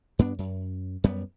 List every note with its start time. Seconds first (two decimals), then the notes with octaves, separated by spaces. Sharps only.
0.19 G2 B3 D4
0.39 F#2
1.04 F#2 G3 B3